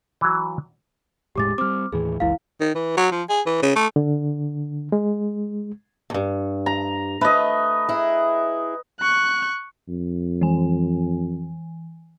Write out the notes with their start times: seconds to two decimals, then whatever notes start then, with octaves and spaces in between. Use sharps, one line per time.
0.21 E3 F#3
1.36 E1 A2 G#3 G4 D6 A6
1.58 G3 C4 D6 F6
1.92 D#2 A2 E3 G#4
2.20 F#1 C#2 E3 E4 F5
2.60 D#3
2.75 E3
2.97 F#3
3.12 F3
3.29 G#4
3.46 E3
3.62 C#3
3.76 A3
3.96 D3
4.92 G#3
6.10 E2 G2
6.66 A#5
7.21 A3 B4 D#5
7.89 E4 G#4
9.00 C#6 F#6
9.88 F2
10.41 E3 G#5